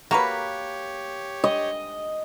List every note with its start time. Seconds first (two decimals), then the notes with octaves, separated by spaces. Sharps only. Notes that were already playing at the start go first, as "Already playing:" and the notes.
0.11 A#3 F#4 G4 A#4 B4 C#5
1.44 D#5